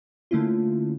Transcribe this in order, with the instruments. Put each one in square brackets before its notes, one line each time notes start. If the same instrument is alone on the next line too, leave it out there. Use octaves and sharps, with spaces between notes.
[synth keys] D3 A3 A#3 C#4 E4 F4